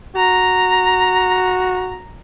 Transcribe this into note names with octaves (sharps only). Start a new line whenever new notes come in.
F#4 A#5